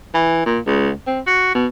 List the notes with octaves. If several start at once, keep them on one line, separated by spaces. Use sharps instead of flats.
E3
A#2
C#2
C4
F#4
B2